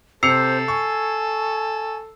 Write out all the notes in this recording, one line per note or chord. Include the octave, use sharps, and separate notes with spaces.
C3 A4 C5 E6 C7 C#7 F7
G#5 C#6